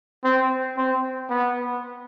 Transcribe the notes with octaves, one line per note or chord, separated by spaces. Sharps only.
C4
C4
B3